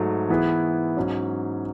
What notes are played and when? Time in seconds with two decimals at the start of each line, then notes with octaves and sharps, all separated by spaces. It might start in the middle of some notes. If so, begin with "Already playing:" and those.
Already playing: G#2 F#3 A3
0.29 E3 B3 E4 G#4
0.97 G#2 F#3 C#4